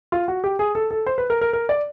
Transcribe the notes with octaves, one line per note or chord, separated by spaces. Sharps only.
F4
F#4
G4
G#4
A4
A4
C5
B4
A#4
A#4
A#4
D5